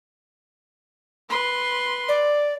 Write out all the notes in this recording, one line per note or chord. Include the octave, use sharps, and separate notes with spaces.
B4 C6
D5